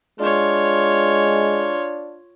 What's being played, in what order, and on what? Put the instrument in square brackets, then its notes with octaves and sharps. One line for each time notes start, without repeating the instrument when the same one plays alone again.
[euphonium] G#3 [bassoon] D4 [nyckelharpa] F4 C#5